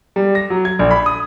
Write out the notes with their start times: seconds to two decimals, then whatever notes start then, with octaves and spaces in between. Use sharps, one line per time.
0.16 G3
0.35 A#6
0.50 F#3
0.65 G#6
0.79 A#1
0.91 B5
1.06 D#6